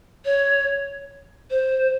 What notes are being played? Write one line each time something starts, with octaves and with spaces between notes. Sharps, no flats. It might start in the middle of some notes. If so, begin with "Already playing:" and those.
C#5
C5